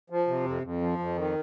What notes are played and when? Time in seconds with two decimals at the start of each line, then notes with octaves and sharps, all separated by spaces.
0.10 F3
0.27 C3
0.45 F2
0.63 F2
0.81 F3
0.99 F2
1.16 D#3